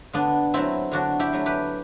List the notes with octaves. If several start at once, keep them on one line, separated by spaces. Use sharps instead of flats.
D3 B3 D4
F#3 A3 C4 E4
D3 D4 F#4
E4 G4
F#3 A3
G4 B4